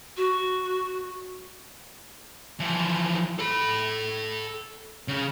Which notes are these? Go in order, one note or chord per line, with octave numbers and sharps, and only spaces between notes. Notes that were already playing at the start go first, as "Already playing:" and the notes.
F#4
E3 F3
A4 B5
C#3